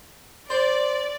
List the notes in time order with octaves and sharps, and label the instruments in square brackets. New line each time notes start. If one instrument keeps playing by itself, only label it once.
[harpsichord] C5 [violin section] D5